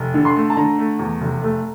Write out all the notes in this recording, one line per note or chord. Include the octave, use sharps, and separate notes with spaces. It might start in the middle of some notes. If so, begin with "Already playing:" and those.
Already playing: F1
D3
C6
A3
A5
D3 A#5
A3
E2
F1
A3